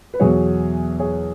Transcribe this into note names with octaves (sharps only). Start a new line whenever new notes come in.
B4
E2 B2 F#3 G#4 C#5
G#4 C#5